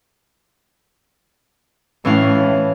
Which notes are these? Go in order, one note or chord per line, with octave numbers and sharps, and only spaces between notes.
A2 E3 C#4 F5